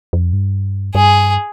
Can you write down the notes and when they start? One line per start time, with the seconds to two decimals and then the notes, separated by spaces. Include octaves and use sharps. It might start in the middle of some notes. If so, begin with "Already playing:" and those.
0.13 F2
0.33 G2
0.95 G2 G#4